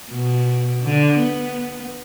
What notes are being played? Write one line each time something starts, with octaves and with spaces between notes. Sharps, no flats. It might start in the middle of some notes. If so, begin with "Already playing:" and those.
B2
D3
B3